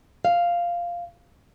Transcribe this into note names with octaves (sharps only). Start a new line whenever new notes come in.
F5